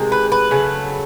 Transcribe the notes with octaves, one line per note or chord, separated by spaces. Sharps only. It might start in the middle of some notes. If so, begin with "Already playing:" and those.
Already playing: C3 D#3 G#3
B4
B4
C#3 F#3 A3